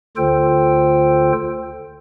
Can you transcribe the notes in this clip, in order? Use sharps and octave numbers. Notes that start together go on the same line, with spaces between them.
D2 D3 F4 A4 C5 G5